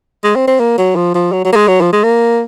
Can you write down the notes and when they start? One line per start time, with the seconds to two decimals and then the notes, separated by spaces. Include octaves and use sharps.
0.24 G#3
0.36 C4
0.48 C4
0.60 A#3
0.78 F#3
0.96 F3
1.15 F3
1.32 F#3
1.45 F#3
1.52 A#3
1.56 G#3
1.68 F#3
1.81 F3
1.93 G#3
2.04 A#3